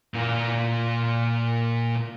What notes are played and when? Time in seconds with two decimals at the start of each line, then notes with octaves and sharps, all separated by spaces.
0.14 A#2 F4